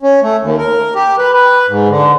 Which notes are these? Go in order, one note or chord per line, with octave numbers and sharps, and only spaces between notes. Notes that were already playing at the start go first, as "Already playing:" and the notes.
C#4
A3
D#2
A#4
G4
B4
B4
G#2
D3